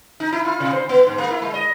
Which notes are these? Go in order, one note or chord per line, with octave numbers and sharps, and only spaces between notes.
D#4
E4
F4
C3
C5
B3
G#2
A#3
E4
G#3
D#5